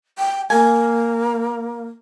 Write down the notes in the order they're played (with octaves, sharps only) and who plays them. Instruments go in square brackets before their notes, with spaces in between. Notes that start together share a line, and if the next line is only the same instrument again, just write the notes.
[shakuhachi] G5
[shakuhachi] A#3 [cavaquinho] G#5